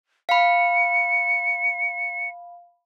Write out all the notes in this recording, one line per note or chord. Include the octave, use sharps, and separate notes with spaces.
F5 B5 C#7